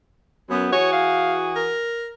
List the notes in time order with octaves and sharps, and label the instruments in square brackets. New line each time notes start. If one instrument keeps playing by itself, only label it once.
[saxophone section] F#2 B3
[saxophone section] E3 F#4 G#4 [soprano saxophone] C#5
[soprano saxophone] F5
A#4